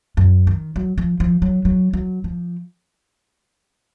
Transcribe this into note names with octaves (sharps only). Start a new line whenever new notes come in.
F#2
D#3
F#3
F3
F3
F#3
F#3
F#3
F3